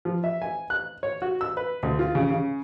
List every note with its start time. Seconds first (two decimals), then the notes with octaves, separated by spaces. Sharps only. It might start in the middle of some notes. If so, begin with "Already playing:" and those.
0.05 F3
0.24 E5
0.42 G#5
0.70 F#6
1.03 C#5
1.22 F#4
1.41 E6
1.57 B4
1.83 D2
1.99 F4
2.15 C#3
2.30 C#3